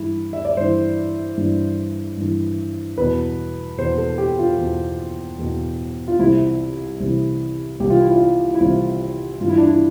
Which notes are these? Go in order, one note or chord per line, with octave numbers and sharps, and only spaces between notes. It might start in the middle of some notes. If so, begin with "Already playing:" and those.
Already playing: G2 E3 E4
E5
D5
G2 E3 C5
G2 E3
G2 E3
E2 B2 B4
E2 B2 C5
A4
G4
F4
E2 B2
E2 B2
F4
C2 C3 E3 E4
C2 C3 E3
C2 C3 E3 G4
F4
E4
F4
E4
C2 C3 E3 F4
G2 E3 F4
E4
D4
E4